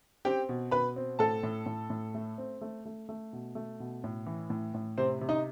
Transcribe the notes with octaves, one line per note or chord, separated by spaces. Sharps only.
C4 G4 G5
B2
B2 B4 B5
C4
A2 A4 A5
A2
A2
A2
A3
C4
A3
A3
A3
B2
A3
B2
A2
E3
A2
A2
C3 C4 C5
C3
D#4 D#5